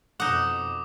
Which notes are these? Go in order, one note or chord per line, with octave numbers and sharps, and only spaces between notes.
F2 B2 D#4 F#5 D6 D#6